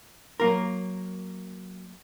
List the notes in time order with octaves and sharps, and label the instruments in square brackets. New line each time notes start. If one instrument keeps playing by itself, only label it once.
[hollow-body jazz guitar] F#3 A#3 A#4